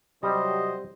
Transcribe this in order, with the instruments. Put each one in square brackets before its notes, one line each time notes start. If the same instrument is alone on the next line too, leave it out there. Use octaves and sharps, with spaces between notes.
[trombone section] C3 F#3 [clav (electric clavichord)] G3 [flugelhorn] C5 [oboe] D#5